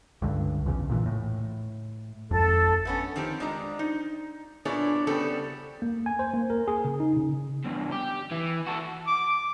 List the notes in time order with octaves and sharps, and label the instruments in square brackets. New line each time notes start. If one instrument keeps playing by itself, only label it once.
[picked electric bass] C#2 G2 D3
A#1 E2 C#3
A#2 D3 E3
A2
[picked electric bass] G#1 F2 [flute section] A4
[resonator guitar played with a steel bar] A3 B3 C#4
D#3 F3 C4 G4
G3 G#3 D4 F4 C5 A#5
D#4
A#2 B3 D4 E4 G#4 C#5
C#3 G3 B3 C4 A4
[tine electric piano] A#3
G#5
C5
A#3
A#4
G#4
C#3
D#4
C#3
[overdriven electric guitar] E2 G2
G4
E3
F#4 A4
[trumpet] D6